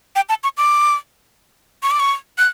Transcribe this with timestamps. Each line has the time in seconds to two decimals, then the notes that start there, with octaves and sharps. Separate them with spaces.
0.16 G5
0.29 A5
0.43 C#6
0.57 D6
1.83 C#6
1.91 D6
2.00 C#6
2.38 F#6